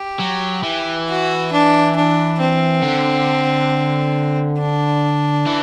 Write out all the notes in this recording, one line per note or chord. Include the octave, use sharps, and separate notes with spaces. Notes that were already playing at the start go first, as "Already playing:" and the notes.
Already playing: G4
F#3
E3
F#4
D4
D4
C4
D3
D4
E3